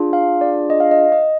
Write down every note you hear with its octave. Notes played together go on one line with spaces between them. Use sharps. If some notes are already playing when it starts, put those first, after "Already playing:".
Already playing: D4 F4 G#4
F5
D5
D#5
F5
D#5
D#5